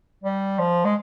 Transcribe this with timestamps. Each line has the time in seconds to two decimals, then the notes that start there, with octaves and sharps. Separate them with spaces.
0.24 G3
0.59 F3
0.85 G#3